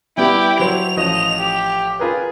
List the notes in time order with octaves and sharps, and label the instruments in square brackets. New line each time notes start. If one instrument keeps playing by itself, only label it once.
[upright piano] G3 B3 [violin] E4 G4 [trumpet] G5
[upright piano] F#3 C5 [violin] F7
[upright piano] A1 F3 [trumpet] D#5
[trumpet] G4
[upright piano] F4 A#4 B4 [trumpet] G#4